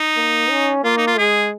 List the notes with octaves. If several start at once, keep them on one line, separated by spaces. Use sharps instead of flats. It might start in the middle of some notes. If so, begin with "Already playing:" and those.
Already playing: D#4
A#3
C#4
A#3 F4
D#4
F4
G#3 G#4